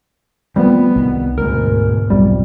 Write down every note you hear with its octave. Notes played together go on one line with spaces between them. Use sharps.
F3 G3 A3 B3 C4
C2 D#3
D2 G#2 B2 A#4
B1 F2 C3 G3